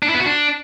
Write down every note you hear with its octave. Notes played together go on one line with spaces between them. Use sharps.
D4
E4
B3
F#4
D4